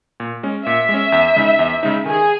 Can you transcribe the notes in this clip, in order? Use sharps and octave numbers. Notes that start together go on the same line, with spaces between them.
A#2
G#3 C#4
A#2 E5
G#3
C#4
E2
C#3 G#3 D#4
E2
C#3 G#3 D#4
D#3 G#4